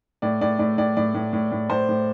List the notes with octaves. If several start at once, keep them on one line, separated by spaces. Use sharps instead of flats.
A2 D5
A2 D5
A2 D5
A2 D5
A2 D5
A2
A2
A2
A2 C5
A2